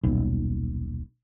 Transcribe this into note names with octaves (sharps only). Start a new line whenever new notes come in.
D#1 B1